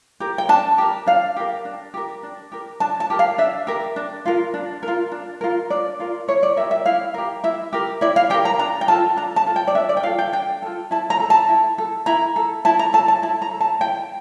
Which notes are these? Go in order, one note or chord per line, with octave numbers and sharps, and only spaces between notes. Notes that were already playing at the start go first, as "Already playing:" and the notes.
G4 A#4
G5
D4 A5
G4 A#4
D4 F5
G4 A#4
D4
G4 A#4
D4
G4 A#4
D4 A5
A5
G4 A#4
F5
D4 E5
G4 A#4
D4
F4 A#4
D4
A#4
F4
D4
F4 A#4
D4 D5
F4 A#4
E4 C#5
D5
G4 A#4 E5
E5
E4 F5
G4 A#4
E4 E5
G4 A#4
E4 D5
F5
G4 A#4 G5
A#5
D4 A#5
G5
F4 A4 A5
D4 A#5
A5
F4 A4
G5
D5
D4 E5
D5
G5
F4 A4 F5
G5
D4 G5
F4 A4
E4 A5
A#5
A4
A5
E4
A4
E4 A#5
A4
E4 A5
A#5
A4 A5
A5
E4 A5
A#5
A4
A5
E4 G5